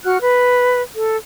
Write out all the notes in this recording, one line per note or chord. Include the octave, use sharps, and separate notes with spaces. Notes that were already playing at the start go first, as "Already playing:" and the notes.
F#4 F#5 F6 F#6
B4
A4